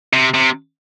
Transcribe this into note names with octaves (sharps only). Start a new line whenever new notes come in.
C3
C3